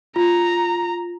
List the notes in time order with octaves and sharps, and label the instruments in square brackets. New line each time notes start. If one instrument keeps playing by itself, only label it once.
[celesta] F4 [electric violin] A#5